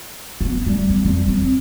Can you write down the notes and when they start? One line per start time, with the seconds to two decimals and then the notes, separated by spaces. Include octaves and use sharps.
0.41 B3 C4
0.67 G3 A3
0.90 C4
1.04 F2 G3
1.28 C4